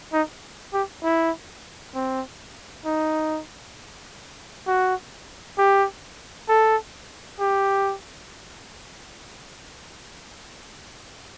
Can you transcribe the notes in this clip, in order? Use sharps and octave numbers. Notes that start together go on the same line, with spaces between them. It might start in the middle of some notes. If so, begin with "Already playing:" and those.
D#4
G4
E4
C4
D#4
F#4
G4
A4
G4